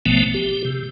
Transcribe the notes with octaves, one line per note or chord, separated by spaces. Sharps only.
A1 B2 F3 A3 B3 G5
G4
C3